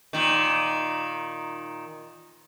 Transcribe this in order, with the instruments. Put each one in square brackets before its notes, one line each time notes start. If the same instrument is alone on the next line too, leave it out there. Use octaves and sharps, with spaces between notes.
[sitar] A#2 D#3